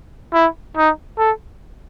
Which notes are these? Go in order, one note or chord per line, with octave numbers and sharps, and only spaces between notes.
E4
D#4
A4